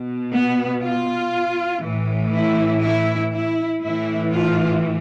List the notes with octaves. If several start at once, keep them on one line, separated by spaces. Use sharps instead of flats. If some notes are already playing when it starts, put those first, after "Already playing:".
Already playing: B2
B3
F4
A2 E3
E4
E4
E4
A2 E3 E4
F4